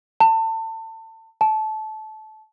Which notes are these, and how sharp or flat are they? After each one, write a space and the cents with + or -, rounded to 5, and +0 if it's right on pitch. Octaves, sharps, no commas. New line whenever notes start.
A5 +30
A5 -20